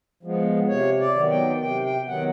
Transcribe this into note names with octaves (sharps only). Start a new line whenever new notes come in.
F3 G#3 B3
C3 C#5
D5
D#3 F#3 B3
G5
C3 G5
G5
D#3 F#3 B3 F#5